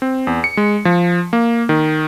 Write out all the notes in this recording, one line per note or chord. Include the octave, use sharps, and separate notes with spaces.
C4
E2
C#7
G#3
F3
A#3
D#3